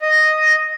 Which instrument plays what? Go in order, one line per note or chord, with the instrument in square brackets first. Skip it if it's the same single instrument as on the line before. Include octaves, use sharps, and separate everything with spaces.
[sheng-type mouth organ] D#5